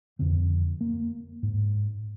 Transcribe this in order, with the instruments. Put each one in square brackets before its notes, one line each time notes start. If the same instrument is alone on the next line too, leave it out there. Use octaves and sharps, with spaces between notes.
[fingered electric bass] F2 D3 C4
A#3
G#2